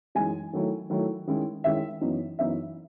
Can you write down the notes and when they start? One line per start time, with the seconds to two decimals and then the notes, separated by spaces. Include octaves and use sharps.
0.15 F#2 E3 G#3 D#4 G#5
0.53 D#3 F#3 A3 E4
0.90 D#3 F#3 A3 E4
1.27 D#3 G#3 C#4 E4
1.64 D#3 G#3 C#4 E4 E5
2.01 F#2 E3 B3 D#4
2.39 F#2 E3 B3 D#4 E5